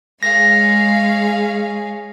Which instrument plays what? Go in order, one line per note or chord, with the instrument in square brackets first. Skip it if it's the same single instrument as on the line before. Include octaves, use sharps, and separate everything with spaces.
[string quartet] G#3 [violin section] G#4 C#5 F5 [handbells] A#6